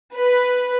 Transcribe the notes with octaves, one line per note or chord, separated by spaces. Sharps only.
B4